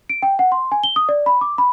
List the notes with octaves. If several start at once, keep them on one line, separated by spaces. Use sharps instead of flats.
D7
G5
F#5
C6
G#5
G7
D#6
D5
B5
D6
B5